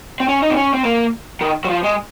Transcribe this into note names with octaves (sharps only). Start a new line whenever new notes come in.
C4
C#4
D#4
C4
C#4
C4
A#3
D#3
F#3
F3
G#3